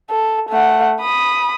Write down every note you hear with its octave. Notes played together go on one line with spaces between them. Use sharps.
A4
A3 F#5
B5 D#6